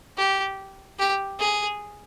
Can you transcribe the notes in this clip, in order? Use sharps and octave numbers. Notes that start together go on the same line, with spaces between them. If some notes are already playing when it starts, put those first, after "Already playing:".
G4
G4
G#4